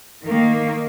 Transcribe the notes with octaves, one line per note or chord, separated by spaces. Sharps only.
D#3 A#3